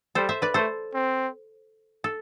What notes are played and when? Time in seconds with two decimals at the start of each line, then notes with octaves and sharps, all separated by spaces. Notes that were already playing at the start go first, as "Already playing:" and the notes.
0.15 G3 A4 C5
0.29 C5 E5
0.42 B4 D5
0.54 A3 A4 C5
0.94 C4
2.04 A4